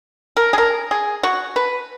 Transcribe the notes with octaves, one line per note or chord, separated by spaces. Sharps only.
A#4
G#4
A#4
G#4
F#4
B4